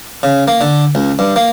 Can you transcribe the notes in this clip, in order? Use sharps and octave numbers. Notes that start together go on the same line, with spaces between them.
C#3
A#3
D3
C#2
G2
A#3